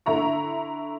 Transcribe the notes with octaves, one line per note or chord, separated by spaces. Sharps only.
D3 E4 A#5 C#6